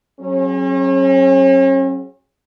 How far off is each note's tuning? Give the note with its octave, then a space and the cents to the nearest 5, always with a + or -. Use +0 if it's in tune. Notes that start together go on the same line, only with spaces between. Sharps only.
F#3 +0 C#4 -40 G#4 +5